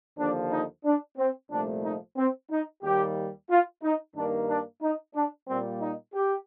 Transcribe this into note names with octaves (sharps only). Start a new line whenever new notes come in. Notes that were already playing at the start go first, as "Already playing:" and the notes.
D#2 D3 F3 A#3 D4
D#4
D4
C4
C2 A#2 F3 A3 D4
D#4
C4
D#4
D#2 D#3 G3 A#3 G4
F4
D#4
G2 D#3 A#3 D4
D4
D#4
D4
A#2 G3 A#3 C4
D#4
G4